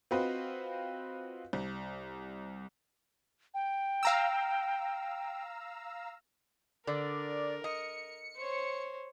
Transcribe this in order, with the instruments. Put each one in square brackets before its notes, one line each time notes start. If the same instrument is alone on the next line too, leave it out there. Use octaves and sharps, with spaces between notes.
[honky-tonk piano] C4 F4 F#4 B4 C5 D#5
C2
[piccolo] G5
[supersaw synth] F5 A#5 E6
[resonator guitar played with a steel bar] D3 [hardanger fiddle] A#4 [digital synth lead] D5
[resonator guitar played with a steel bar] D#5 [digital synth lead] C#7
[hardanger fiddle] C5 C#5